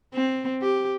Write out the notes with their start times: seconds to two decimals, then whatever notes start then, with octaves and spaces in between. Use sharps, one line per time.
0.14 C4
0.61 G4